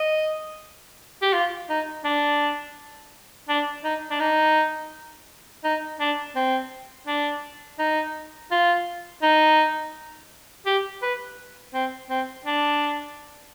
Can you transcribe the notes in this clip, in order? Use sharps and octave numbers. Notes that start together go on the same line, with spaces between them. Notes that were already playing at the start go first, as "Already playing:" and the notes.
Already playing: D#5
G4
F4
D#4
D4
D4
D#4
D4
D#4
D#4
D4
C4
D4
D#4
F4
D#4
G4
B4
C4
C4
D4